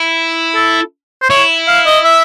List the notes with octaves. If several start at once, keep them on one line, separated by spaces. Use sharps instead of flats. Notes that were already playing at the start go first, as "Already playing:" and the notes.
Already playing: E4
A4
C5
E4 C#5
F5
D#5
E5